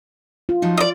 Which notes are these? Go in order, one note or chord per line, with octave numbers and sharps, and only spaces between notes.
F4
F3 F#3 D#4
D5 D#5